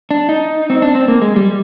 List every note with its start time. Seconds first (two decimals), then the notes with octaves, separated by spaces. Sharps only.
0.11 D4
0.29 D#4
0.70 C4
0.82 D4
0.95 C4
1.08 A#3
1.22 G#3
1.36 G3